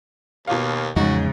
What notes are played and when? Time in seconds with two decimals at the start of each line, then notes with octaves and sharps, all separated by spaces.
0.47 D#2 B2 F5
0.96 E2 G#2 C#3 F3 G#3 D#4 F#4